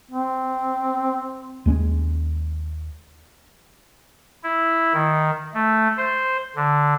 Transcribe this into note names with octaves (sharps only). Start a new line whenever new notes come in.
C4
D#2 G#3 A#3 C#4
E4
D#3
A3
C5
D3